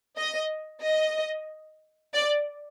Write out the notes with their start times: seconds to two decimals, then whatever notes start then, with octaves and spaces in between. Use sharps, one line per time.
0.17 D#5
0.82 D#5
2.14 D5